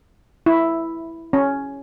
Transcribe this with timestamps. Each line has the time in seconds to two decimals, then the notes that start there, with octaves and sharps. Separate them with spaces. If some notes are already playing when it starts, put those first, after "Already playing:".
0.46 E4
1.33 C#4